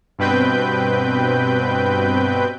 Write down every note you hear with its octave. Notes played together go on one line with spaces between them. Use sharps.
G2 B2 C4 B4 G5 G6